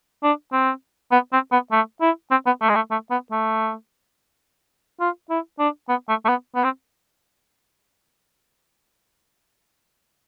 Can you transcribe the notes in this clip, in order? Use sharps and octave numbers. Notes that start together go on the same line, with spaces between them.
D4
C4
B3
C4
B3
A3
E4
C4
B3
A3
G#3
A3
A3
B3
A3
F4
E4
D4
B3
A3
A3
B3
B3
C4